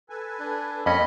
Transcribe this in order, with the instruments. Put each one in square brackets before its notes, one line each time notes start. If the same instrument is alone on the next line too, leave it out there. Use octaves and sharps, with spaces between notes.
[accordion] A4 B4 G#5
[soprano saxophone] D4
[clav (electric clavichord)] F2 C#4 [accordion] G3 A#3 B3 [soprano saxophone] D#5 [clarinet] B5